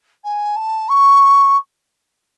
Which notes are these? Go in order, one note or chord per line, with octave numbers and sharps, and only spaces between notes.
G#5
A5
C#6